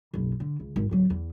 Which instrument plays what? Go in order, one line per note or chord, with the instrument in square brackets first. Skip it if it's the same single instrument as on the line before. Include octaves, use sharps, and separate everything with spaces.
[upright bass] F#1 B1
D3
C#2
G#1
D1 F#3
E2